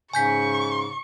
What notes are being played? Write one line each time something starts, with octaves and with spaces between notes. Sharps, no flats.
G#2 C#3 G#5 C#6 G6 B6